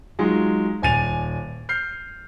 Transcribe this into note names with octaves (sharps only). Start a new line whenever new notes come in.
F#3 G#3 D#4 F4 G#4
D#1 G#5 A6 D#7 F7
F6 G6 C7